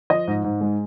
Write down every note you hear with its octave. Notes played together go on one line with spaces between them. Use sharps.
F3 D#5
G#2
G#2
G#3